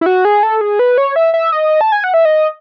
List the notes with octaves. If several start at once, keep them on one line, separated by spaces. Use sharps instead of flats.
E4
F#4
G#4
A4
G#4
B4
C#5
E5
E5
D#5
A5
G#5
F#5
E5
D#5